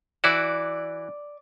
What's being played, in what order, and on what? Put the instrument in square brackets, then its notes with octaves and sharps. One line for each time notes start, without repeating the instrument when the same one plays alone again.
[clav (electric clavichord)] E3 E4 F#4 [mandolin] D5